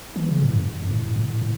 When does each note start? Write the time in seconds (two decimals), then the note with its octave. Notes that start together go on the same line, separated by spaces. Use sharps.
0.16 E3
0.29 C#3
0.41 A2
0.54 F#2
0.82 F#2
0.91 A2
1.16 A2
1.41 A2